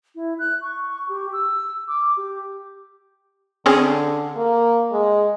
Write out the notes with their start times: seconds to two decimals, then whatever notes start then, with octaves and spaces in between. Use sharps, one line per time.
0.15 E4
0.39 F#6
0.61 C#6
1.09 G4
1.33 E6
1.88 D6
2.17 G4
3.66 D3 C4 C#4 G#4
4.36 A#3
4.92 G#3